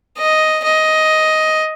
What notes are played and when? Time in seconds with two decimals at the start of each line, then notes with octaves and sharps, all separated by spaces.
0.18 D#5
0.64 D#5